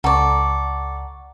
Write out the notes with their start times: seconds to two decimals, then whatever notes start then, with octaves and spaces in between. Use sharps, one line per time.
0.04 C#2 A4 D5 F#5 A#5 C#6